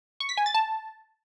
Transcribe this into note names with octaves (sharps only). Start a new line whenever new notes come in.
C#6
B6
G#5
A6
A5